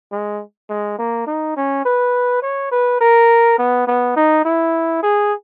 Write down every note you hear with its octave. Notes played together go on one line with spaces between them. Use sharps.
G#3
G#3
A#3
D#4
C#4
B4
C#5
B4
A#4
B3
B3
D#4
E4
G#4